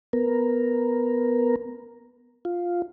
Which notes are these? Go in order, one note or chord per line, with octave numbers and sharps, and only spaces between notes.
B3 A#4
F4